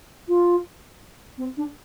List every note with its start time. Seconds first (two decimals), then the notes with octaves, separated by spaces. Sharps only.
0.28 F4
1.38 C4
1.57 D4